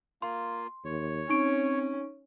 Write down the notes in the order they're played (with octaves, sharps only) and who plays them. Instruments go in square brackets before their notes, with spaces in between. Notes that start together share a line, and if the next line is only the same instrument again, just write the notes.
[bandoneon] A#3 F4 [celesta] C6
[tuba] D#2 [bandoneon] C#5
[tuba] C4 [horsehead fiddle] C#4 [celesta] D#4 C#6 D7